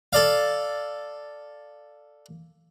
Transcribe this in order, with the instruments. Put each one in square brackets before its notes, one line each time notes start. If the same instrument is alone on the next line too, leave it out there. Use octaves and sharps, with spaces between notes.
[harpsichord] A4 D5 F5